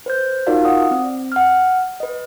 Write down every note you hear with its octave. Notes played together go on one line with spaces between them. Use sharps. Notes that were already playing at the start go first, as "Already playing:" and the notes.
B4 C5 G6
D#4 F4 F#4 A#4 D5 F5
D5 F#5 D#6
C4
F#5 F6
B4 D#5